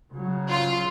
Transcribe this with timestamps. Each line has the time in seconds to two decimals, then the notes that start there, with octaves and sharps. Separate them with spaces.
0.13 C#3 F#3
0.50 F4